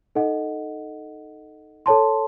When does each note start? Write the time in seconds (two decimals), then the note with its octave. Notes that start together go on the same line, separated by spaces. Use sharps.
0.15 D#4 A4 D#5 F#5
1.86 A4 C#5 A5 C6